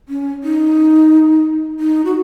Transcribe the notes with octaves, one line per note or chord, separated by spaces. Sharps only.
C#4
D#4
D#4
F#4